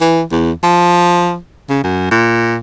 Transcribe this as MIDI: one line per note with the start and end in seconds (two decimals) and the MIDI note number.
0.01 0.23 52
0.32 0.51 40
0.63 1.37 53
1.70 1.84 49
1.84 2.09 42
2.11 2.56 46